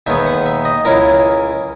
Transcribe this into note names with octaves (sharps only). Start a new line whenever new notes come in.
D#2 D#3 G#3 B3 E5
F#5
E5
D#5
C#2 C#3 G#3 C#4 E4 A#4